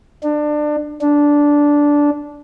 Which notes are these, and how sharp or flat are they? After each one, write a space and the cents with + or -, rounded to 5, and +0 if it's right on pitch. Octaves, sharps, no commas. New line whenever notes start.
D4 +25
D4 -10